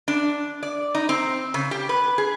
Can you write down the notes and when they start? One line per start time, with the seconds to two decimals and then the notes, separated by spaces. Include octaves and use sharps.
0.08 D4
0.63 D5
0.95 D#4
1.09 C4
1.54 C#3
1.71 G4
1.89 B4
2.18 G#4